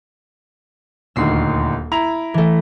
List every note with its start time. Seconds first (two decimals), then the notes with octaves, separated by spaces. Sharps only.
1.16 D#1 D2 D#3 E6 C7
1.92 E4 A#5 F7
2.34 E3 A3